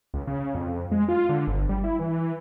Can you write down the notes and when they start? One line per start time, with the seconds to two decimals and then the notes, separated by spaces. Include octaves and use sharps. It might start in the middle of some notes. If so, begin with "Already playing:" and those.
0.14 C#2
0.27 C#3
0.55 F2
0.92 G#3
1.08 F4
1.29 D3
1.47 G1
1.69 G3
1.84 E4
1.99 E3